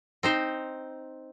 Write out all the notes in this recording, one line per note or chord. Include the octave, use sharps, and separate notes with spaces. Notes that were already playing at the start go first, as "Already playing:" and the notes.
C4 D#4 C5